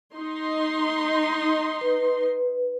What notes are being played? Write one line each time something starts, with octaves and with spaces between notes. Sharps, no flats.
D#4 C6
B4